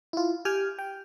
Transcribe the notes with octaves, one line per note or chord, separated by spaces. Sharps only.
E4 F4
G4 G5 G#5 F6
G5